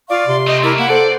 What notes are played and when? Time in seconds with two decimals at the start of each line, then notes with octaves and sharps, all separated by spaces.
0.10 F4 D5 F5 C#6
0.27 C3 C6
0.47 A3 C4 D#5
0.63 A3 D4 E4 A#4 D6 E6
0.78 A#3 E4 F#5
0.90 A4 C5 D5